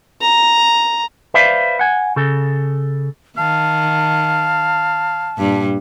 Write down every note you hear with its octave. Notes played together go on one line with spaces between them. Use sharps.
A#5
B4 C5 D5 E5 F5
F#5 G#5
C#3 A4
D#3 F5 A5
G2 A#2 G3